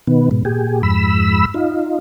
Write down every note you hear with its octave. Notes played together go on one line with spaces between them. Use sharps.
B2 D#3 B3
G#2 B2
A#2 G4 G#4
F2 G#2 B5 E6
D#4 F4